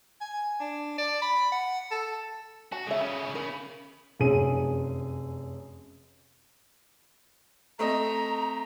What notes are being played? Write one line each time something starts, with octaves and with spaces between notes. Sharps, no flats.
G#5
D4
D5
B5
F#5
A4
F#4 A5
C#3 G#3 B3 E5
C#4
C#4 A#4 B5
F1 F#2 G#4 D#7
A3 C4 D#5 A#5